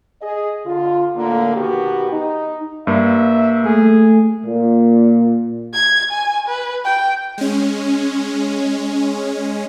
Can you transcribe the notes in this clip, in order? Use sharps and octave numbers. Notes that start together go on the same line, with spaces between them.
G#4 D#5
D3 F4
A2 D3 A#3
B2 D#3 B3 F#4 G4
D#4
G2 A#3 E5
A3 G#4
A#2
G#6
G#5
B4
G5
G#3 C#4